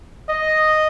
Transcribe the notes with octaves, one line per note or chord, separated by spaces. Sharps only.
D#5